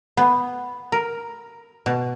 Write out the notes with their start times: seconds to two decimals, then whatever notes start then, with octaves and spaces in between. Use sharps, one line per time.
0.17 B3
0.92 A#4
1.86 B2